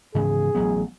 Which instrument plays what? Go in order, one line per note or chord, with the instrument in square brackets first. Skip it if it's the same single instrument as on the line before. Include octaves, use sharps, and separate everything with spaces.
[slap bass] G#2 C#3 E3 [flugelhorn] G#4
[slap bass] A1 F#3 B3